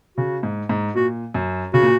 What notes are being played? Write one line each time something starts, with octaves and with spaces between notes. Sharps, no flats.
C#3 F#4
G#2
G#2
A#2 F#4
F#2
C#3 F#4
A#2